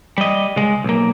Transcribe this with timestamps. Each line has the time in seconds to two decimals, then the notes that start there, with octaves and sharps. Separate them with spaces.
0.18 G3 D#5
0.56 C#3 G#3
0.84 B1 A#3